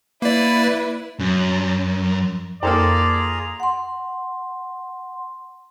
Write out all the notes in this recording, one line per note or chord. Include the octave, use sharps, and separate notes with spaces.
A#3 E4 B4 D5
F#2
F2 A#3 F4 G#4 A4 C5 D5 A#5
F#5 C6